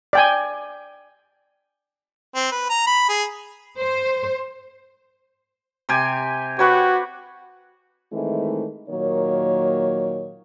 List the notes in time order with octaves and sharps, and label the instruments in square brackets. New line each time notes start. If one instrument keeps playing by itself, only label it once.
[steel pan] D5 G5 G#5
[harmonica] C4
B4
A#5
B5
G#4
[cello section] C5
[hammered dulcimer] C3 G4 G#5
[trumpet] F#4 [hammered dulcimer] G4 B4 C#5
[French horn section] D#3 E3 G#3 A3 C4 E4
A#2 D#3 F#3 A#3 C#5